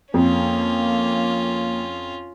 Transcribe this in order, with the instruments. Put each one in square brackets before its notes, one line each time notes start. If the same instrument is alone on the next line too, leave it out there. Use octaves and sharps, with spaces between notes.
[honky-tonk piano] F2 [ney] A#3 [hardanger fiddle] C#4 F4